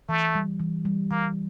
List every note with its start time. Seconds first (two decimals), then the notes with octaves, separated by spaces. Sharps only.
0.09 E3 A3
0.35 G3
0.60 E3
0.85 G3
1.11 E3 A#3